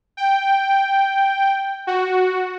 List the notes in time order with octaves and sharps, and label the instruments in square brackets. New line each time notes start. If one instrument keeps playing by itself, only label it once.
[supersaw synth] G5
F#4